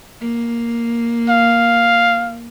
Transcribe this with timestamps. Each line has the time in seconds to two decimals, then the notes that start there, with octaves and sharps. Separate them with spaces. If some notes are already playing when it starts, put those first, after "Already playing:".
0.21 A#3
1.30 F5